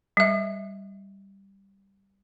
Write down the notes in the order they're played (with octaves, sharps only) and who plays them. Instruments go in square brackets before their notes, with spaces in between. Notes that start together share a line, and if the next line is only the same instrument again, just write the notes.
[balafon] G3 E5